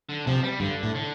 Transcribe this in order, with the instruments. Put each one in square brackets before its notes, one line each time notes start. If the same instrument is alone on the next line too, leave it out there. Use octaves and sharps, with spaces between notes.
[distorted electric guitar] D3
[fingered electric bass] C3 [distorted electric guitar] F3
[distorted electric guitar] G3
[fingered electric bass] G2 [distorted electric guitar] D3
[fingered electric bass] A2
[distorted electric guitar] D3